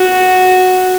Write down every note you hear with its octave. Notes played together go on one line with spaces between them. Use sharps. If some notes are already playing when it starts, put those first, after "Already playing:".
Already playing: F#4